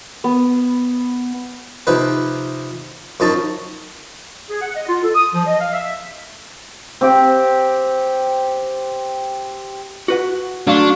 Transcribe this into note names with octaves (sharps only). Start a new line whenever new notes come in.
B3
C3 F3 D#4 B4
F#2 F3 D#4 A5 C#6
G#4
F#5
D#5
F4
A4
D#6
F3
D#5
F5
E5
C4 G4 G5
F#4 B4 F#5
F#3 A3 D4 F#4 F5 C#6